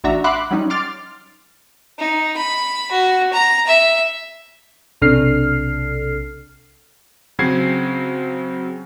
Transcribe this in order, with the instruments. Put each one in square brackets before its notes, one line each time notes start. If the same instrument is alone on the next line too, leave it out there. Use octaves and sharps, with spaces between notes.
[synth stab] A1 D4 F#4 E5 A#5
E5 F#5 B5 C6 D6 F#6
F#3 G3 C#4 D#4
C6 D6 F6 A6
[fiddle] D#4
B5
F#4
A#5
E5
[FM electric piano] B1 C3 D4 A4 F6 C7
[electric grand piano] C#3 F#3 C4 F#4 G#6 C7